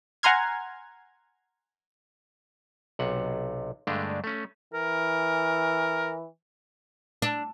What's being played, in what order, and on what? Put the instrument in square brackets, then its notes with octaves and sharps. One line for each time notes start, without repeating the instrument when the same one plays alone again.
[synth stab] F#5 G#5 A#5 C6 F6 G#6
[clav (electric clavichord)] B1 C3 F#5
G2 D3 G#3 A3 D4
A3 C#4
[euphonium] E3 [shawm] A#4
[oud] D4